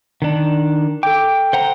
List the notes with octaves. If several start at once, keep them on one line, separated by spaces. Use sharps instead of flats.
D#3 D4
A4 G5 D6
C5 F#5 A#5